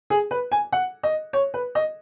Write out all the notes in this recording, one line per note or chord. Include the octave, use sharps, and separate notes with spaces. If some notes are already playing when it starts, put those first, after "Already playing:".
G#4
B4
G#5
F#5
D#5
C#5
B4
D#5